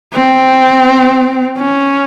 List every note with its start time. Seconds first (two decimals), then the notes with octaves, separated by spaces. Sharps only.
0.13 C4
1.58 C#4